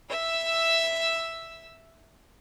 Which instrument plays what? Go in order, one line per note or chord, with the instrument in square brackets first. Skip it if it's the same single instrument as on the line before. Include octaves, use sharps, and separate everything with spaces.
[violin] E5 E6